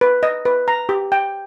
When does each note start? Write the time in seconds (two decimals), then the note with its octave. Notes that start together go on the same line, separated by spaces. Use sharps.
0.01 B4
0.23 D#5
0.45 B4
0.68 A#5
0.89 G4
1.12 G5